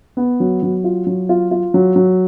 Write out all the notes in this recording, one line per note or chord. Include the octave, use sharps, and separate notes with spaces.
B3
F#3
F#3
F4
F#3
F4
F4
F#3
F#3